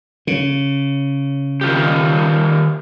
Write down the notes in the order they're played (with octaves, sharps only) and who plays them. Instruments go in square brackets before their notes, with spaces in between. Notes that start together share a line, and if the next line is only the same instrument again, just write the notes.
[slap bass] C#3
[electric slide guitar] D#3 F4 G4